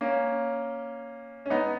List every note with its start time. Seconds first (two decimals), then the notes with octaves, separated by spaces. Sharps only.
0.01 A#3 C#4
1.46 C#4
1.50 B3 D#4